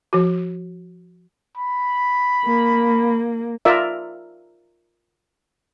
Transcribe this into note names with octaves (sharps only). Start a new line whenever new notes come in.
F3 F#4
B5
A#3
F4 A#4 D5 E5